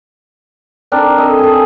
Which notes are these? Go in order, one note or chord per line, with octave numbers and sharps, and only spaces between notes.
C4 D4 A#4
A4 D#5
G#4 A4